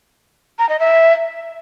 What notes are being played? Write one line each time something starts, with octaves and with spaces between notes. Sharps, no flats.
A#5
D#5
E5